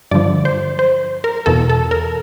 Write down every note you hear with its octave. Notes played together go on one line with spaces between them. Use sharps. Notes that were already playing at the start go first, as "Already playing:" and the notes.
G2 D3 F3 D5
C5
C5
A#4
E2 B2 A4
A4
A#4